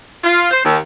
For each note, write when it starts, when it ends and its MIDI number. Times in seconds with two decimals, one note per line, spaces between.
0.23 0.49 65
0.51 0.62 72
0.63 0.76 39